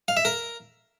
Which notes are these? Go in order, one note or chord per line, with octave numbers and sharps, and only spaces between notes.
F5
E5
A#4